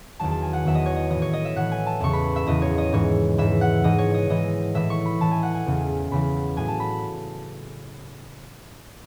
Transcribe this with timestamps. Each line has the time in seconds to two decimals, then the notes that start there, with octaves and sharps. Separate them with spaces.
0.19 E2 D#3 F#3 A5
0.31 A5
0.42 G#5
0.53 F#5
0.64 E2 D#3 F#3 E5
0.75 D#5
0.86 C#5
0.96 D#5
1.10 A2 E3 D#5
1.22 C#5
1.33 D#5
1.45 E5
1.56 A2 E3 F#5
1.72 G#5
1.86 A5
2.00 E2 C#3 E3 C#6
2.13 B5
2.36 E5
2.47 E2 C#3 E3 D#5
2.62 C#5
2.78 D#5
2.93 G#2 E3 C#5
3.38 G#2 E3 E5
3.61 F#5
3.84 G#2 E3 D#5
3.98 C#5
4.14 D#5
4.29 G#2 E3 D#5
4.75 A2 E3 E5
4.90 C#6
5.05 B5
5.20 A2 E3 A5
5.31 G#5
5.43 F#5
5.54 G#5
5.66 E2 C#3 E3
6.11 E2 C#3 E3 B5
6.56 A2 F#3 G#5
6.68 A5
6.80 B5